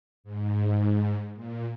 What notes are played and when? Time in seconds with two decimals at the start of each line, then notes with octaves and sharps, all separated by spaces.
0.24 G#2
1.35 A#2